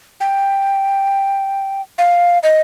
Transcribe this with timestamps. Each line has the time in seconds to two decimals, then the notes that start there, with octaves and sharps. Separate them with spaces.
0.20 G5
1.98 F5
2.43 D#5